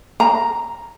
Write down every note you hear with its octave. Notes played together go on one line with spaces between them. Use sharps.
A#5